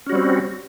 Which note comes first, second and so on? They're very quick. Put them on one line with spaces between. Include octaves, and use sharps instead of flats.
C#4 F#4 G3 C4